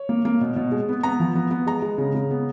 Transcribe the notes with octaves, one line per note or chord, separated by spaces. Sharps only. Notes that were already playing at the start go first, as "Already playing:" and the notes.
Already playing: C#5
A#3
A#3
B2
B2
G#3
B3
B3 A#5
F3
B3
B3
G#3 A#5
G#3
C#3
C#3
B3